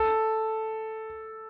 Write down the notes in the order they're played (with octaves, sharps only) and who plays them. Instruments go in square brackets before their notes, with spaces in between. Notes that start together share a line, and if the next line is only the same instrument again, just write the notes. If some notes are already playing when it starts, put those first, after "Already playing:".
Already playing: [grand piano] A4